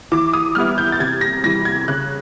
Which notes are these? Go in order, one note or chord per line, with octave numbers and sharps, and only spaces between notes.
E3 D6
D#6
G3 B3 E4 F6
G6
A6
C3 G#6
A#6
E3 G3 A#6
G#6
C#3 F#6